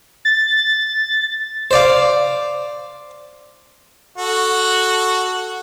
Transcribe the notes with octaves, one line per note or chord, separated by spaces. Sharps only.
A6
C5 D5 F5
F#4 A4